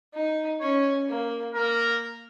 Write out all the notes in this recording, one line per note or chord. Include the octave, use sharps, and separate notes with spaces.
D#4
C#4 C#5
A#3
A#3 A#4